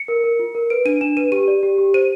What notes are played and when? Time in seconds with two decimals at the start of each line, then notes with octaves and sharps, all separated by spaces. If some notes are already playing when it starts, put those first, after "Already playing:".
Already playing: C#7
0.08 A#4
0.24 A#4
0.39 F4
0.55 A#4
0.70 B4 D7
0.85 D4 D#7
1.01 D4 E7
1.17 B4 D#7
1.32 G4 D#7
1.48 D5
1.63 G4
1.78 G4
1.94 C5 D#7